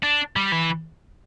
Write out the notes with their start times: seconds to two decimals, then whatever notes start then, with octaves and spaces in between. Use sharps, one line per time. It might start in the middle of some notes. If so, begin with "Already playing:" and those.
0.03 D4
0.36 G3
0.52 E3